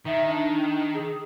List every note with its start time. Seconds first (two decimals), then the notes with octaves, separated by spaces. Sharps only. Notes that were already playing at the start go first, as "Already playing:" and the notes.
0.06 D#3 E5
0.28 D4
0.93 G#4